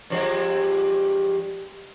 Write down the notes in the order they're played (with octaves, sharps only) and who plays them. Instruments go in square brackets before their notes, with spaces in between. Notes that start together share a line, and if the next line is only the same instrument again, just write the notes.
[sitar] G2 F3 G#3